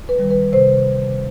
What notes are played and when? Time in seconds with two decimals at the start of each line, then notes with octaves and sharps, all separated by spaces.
0.09 B4
0.19 D#3 G3
0.31 B4
0.53 C3 C5